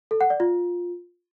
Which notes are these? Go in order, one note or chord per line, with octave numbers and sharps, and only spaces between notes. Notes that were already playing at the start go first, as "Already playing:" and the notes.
A4
F#5
D5
F4